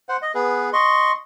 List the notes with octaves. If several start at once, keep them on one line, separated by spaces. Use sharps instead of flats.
C5 F#5
D#5
B3 G#4 B4
D#5 C6 C#6